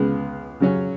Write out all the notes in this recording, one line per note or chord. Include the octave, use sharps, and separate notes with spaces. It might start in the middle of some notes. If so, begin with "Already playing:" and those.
Already playing: C#2 C#3 G#3 B3
C#3 F#3 C#4